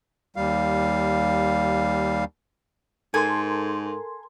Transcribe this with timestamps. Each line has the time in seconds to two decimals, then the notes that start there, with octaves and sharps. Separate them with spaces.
0.36 D#2 G3 F5
3.14 G#2 A4 A#4 G#5 C6